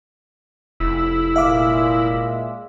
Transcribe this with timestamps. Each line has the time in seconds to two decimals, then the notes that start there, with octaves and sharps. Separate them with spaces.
0.80 F1 E4
1.36 A#2 G#3 E5 F5 D6